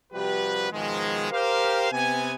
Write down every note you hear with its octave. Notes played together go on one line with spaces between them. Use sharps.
C3 F3 G3 F#4 G4 B4
G#2 B2 D#3 F3 G#3
G4 A#4 C5 F5
C3 B3 G#5